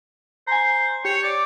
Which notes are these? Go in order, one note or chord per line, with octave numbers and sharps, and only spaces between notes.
C5 G#5 A#5
G4 C#5
D5